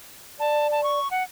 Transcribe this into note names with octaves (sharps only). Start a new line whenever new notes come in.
D5 A5
A5
C#6
F#5